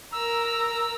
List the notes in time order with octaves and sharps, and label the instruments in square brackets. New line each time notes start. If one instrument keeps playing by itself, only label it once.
[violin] A#4 A#5 [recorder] E6